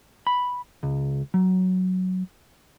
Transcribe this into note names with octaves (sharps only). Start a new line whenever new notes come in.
B5
C#2
F#3